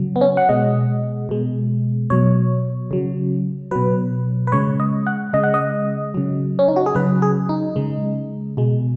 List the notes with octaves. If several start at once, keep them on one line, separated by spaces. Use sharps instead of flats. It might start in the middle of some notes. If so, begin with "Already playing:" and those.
Already playing: C#3 F#3
B3
C#4
F#5
B2 G#3 D#5
B2 G#3
B2 F#3 C#5
C#3 F#3
B2 F#3 B4
B4
C#3 G#3 C#5
D#5
F#5
C#3 G#3 D#5
F#5
D#5
C#3 F#3
C#4
D#4
F#4
G#4
C#3 F#3 B4
G#4
D#4
C#3 G#3
B2 G#3